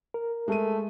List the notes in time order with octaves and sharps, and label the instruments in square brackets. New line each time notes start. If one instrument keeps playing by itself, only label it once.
[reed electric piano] A#4
[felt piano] G#3 D#7 [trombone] A3